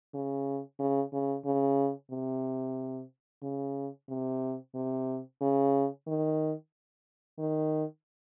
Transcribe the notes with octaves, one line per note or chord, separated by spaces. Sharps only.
C#3
C#3
C#3
C#3
C3
C#3
C3
C3
C#3
D#3
D#3